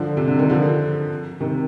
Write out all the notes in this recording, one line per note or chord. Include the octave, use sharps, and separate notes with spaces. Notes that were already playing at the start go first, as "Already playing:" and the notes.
Already playing: D3 F3
C3
D3
D#3
D3 F3
C3 D#3